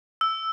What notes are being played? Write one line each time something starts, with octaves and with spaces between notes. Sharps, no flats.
E6